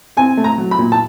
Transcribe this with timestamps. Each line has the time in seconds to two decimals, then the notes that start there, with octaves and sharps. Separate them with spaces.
0.17 C4 G#5
0.37 A3
0.44 A#5
0.58 F#3
0.71 B5
0.79 A#2
0.92 A5